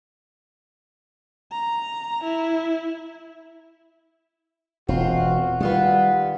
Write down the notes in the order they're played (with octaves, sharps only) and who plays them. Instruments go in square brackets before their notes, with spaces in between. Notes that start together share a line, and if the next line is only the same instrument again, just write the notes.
[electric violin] A#5
E4
[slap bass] E1 [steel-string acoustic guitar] C4 F4 [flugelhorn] F#4
[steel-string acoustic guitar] D#3 F4 B4 [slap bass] G3 [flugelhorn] F#5